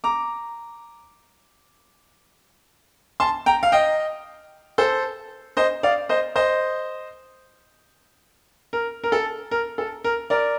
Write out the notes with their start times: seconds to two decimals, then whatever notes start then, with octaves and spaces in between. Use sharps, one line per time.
0.04 A#5 D6
3.20 A5 C6
3.46 G5 A#5
3.63 F5
3.72 D#5 G5
4.78 A4 C5
5.57 C5 D#5
5.83 D5 F5
6.09 C5 D#5
6.36 C5 D#5
8.73 A#4
9.04 A#4
9.12 A4
9.51 A#4
9.78 A4
10.04 A#4
10.30 A#4 D5